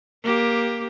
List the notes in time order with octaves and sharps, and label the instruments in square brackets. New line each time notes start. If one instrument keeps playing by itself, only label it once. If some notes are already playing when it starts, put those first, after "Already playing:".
[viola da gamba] A#3 G4